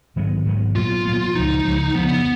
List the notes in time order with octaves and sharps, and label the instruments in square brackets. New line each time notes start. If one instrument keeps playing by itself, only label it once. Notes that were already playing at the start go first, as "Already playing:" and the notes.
[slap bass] G#2 D#3 F#3 B3
G#2 D#3 F#3 B3
[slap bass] A#2 F#3 B3 [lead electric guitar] F4
[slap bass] A#2 F#3 B3
[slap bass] C#2 C#3 F3 [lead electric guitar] D#4
[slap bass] C#2 C#3 F3
[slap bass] F2 C#3 F3 [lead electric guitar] B3